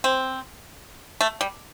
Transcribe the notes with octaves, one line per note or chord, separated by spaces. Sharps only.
C4
A3
G3